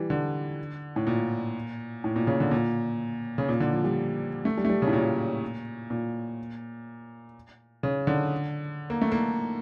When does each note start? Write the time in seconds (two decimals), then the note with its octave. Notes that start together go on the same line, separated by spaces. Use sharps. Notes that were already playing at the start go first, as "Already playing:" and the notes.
Already playing: E3 G3
0.10 D3
0.96 A2
1.07 A#2
2.04 A2
2.16 A#2
2.27 C#3
2.40 D3
2.51 A#2
3.38 C#3
3.49 A#2
3.60 D3
3.73 F3
3.84 G3
4.45 A3
4.58 G3
4.65 A3
4.69 G3
4.82 C#3
4.87 A2
4.93 A#2
5.90 A#2
7.83 C#3
8.07 D3
8.90 A#3
9.01 A3
9.12 A#3